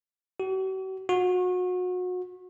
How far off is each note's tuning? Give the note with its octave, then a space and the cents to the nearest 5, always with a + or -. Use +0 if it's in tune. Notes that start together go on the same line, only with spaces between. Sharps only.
F#4 +45
F#4 -30